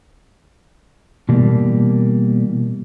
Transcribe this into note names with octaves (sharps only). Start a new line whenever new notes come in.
B2 E3 G3 A#3